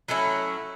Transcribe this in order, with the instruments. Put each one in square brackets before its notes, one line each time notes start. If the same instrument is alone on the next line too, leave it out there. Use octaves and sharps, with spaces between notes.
[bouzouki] F#3 A3 C#4 E4